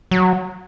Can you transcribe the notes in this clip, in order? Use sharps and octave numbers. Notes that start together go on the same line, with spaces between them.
F#3